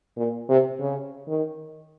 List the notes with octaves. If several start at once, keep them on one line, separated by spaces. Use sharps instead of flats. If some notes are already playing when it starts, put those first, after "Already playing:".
A#2
C3
C#3
D#3